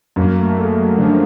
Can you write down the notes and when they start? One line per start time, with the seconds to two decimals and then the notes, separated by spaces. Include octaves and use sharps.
0.16 F#2 A#3
0.38 A3
0.58 G#3 A3
0.77 F#3
0.98 D3 F3